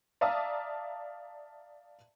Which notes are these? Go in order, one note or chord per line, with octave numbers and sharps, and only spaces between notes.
D5 E5 F5 A5 A#5 D#6